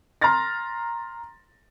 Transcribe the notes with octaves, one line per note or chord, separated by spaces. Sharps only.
A#5 C6 F6 A6 A#6